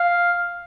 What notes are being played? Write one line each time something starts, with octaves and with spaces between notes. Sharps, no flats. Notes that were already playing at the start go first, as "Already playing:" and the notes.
Already playing: F5